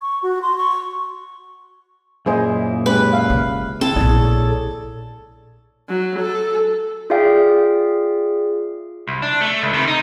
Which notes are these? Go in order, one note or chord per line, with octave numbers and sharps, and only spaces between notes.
C#6
F#4
C6
C#6
F#2 A#2 E4 G#4 C5 D#5
G#3 C#4 G4 B4
E5 F5
C#3
C4 E4 A4
A#1 E4 G#4 C#5 D5
F#3
A4
F4 G#4 D5 E5 F5 G5
C2
D4
A3
C#2
C3 D#3
D#4